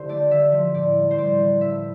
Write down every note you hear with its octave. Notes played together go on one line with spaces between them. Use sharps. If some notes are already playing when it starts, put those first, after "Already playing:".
Already playing: D3 E3 G4 A4 C5
A3 D5
D3 E5
F3
A2 D5
G3
C5
A2 D5
E3
A2 E5